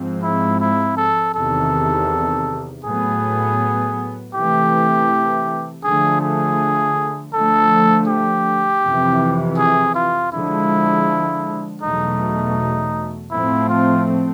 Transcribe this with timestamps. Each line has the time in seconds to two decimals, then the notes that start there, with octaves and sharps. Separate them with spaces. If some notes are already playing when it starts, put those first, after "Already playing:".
Already playing: G#2 F3 G#3 C4
0.23 E4
0.60 E4
0.97 A4
1.34 E2 C3 D#3 A4
2.84 A2 F#3 B3 G#4
4.34 C3 E3 A3 G4
5.83 D3 F3 A3 G#4
6.21 G#4
7.33 D3 F3 A3 A4
8.08 G4
8.82 F2 C3 E3
9.57 G#4
9.95 F4
10.32 D3 F3 G#3 E4
11.82 E2 B2 F#3 A3 D#4
13.31 A2 F3 A3 C4 E4
13.69 F4